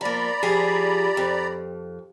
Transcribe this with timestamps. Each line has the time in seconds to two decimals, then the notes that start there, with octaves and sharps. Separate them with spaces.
0.01 F3 A#3 D5 A#5 B5
0.43 F3 G4 G#4
1.17 F2